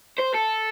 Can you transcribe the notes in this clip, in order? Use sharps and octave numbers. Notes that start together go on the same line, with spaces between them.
C5
A4